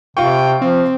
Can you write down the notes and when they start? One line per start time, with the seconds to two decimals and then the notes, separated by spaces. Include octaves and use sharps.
0.17 C3 F4 F5 G5 C#6
0.62 F3 C4